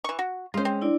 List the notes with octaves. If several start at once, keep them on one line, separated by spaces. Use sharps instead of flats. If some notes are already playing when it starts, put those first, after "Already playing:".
E3 C#6
F#4
G#3 C#4 F4 C5
C4
D4 E4 D5